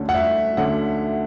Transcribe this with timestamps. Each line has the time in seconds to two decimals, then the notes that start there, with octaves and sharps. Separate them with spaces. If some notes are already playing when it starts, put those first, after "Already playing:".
Already playing: D2 D3 A3 C#4
0.09 F#5
0.14 E5
0.57 D2 D3 A3 C#4 F#5